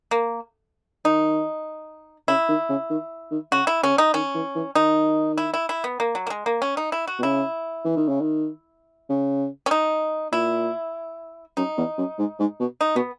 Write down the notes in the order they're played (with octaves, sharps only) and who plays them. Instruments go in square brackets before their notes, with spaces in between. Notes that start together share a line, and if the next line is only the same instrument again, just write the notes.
[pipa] A#3
[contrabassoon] D#3 [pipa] D#4
[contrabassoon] C#3 [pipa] E4
[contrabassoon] D#3
C#3
D#3
D#3
[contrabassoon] C#3 [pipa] F#4
[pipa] E4
[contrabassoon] C#3 [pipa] C#4
[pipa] D#4
[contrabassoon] D#3 [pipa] C#4
[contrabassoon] E3
E3
[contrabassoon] D#3 [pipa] D#4
[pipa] E4
E4
E4
B3
A#3
F#3
A#3
G#3
A#3
C#4
D#4
E4
F#4
[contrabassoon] B2
[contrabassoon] C#3 [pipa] E4
[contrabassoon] E3
D#3
C#3
D#3
C#3
[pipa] C#4
D#4
[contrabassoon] A#2 [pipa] E4
[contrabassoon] F#2 [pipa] D#4
[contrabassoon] E2
F#2
G#2
G#2
B2
[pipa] D#4
[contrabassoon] B2 [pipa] B3